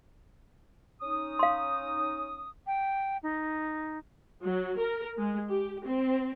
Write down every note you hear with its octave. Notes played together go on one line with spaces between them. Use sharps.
C#4 D#4 D#6
F5 C6
G5
D#4
F#3
A#4
G#3
G4
C4